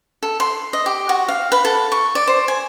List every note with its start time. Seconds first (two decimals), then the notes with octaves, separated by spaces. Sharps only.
0.23 A4
0.40 C6
0.73 D#5
0.86 G4
1.09 F#4
1.28 F5
1.52 B4
1.65 A4
1.92 C#6
2.15 D5
2.27 C5
2.48 G#5